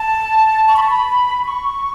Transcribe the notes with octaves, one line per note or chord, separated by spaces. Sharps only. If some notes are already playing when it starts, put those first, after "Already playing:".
Already playing: A5
C#6
B5
A5
B5
C#6